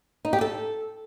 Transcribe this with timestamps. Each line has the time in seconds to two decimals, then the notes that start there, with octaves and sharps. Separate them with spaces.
0.25 D#4
0.33 G4
0.41 A4